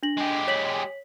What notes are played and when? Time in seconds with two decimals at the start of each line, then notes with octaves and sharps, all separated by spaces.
0.03 D4 A#6 F#7
0.18 G#3 G4
0.47 C#5 B6 F#7